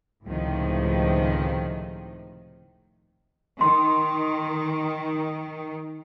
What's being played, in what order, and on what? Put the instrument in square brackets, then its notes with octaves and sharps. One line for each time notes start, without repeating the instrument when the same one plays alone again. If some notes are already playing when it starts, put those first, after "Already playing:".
[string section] C#2 A2 C3 D#3 F3
[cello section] D#3 [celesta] C6